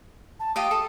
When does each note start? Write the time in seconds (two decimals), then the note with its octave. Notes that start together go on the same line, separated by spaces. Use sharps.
0.40 A5
0.56 F4 G4 D#5 D#6
0.71 A4